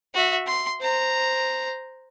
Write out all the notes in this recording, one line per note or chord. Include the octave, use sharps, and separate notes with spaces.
F#4 E5
C6
C5 A#5